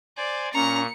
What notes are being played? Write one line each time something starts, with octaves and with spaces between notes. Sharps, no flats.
C5 D5 G#5
A#2 C#4 A#5 C#6 C#7